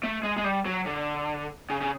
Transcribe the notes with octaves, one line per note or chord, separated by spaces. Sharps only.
A3
G#3
G#3
G3
F#3
D3
C#3
C#3